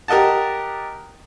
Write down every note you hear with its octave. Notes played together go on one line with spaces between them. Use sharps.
G4 A#4 D#5 F#5 A5